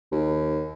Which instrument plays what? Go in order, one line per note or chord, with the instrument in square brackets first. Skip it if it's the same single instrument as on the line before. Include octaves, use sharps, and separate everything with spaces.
[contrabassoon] D#2